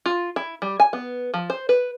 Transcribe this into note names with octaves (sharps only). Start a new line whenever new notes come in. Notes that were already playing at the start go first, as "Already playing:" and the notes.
F4
E4
G3
G#5
B3
F3
C5
B4